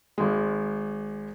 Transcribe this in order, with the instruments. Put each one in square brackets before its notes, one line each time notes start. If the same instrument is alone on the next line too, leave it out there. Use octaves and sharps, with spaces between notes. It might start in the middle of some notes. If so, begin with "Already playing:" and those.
[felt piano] G#1 G#3